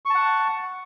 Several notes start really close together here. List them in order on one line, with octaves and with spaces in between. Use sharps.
C#6 A5 F#5